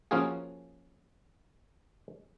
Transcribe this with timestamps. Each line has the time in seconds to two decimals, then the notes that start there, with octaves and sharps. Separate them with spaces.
0.11 F3 A#3 C#4 F4 F#4 G#4